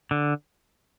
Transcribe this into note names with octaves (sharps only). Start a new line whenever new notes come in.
D3